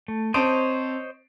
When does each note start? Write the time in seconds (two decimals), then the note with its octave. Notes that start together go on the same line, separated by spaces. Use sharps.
0.08 A3
0.34 C4 C5 C#5 D#5 A5 D7